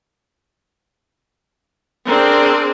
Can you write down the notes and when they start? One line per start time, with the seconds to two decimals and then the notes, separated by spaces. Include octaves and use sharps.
2.09 C4 D4 G#4 A#4